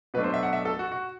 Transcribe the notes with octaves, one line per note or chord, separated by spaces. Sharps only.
B2 F#3 A3 D4 B4
C5
E5
F#5
E5
A4
F#4
F#4